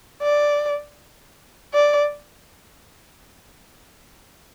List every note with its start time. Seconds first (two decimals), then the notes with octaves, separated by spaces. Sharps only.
0.23 D5
1.74 D5